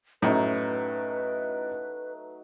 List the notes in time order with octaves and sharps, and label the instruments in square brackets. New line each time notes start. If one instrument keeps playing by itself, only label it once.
[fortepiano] F#2 A2 [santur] F#3 A3 D#4 [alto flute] B4